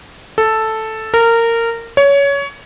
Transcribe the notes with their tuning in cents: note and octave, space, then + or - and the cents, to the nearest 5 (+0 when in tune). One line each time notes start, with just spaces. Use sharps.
A4 +0
A#4 -20
C#5 +20